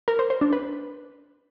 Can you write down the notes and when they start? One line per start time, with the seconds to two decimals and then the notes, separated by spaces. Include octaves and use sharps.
0.08 A#4
0.19 C5
0.30 C5
0.41 D4
0.53 B4